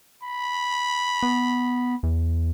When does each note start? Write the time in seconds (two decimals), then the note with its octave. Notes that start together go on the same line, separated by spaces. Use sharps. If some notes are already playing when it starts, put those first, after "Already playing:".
0.23 B5
1.23 B3
2.03 E2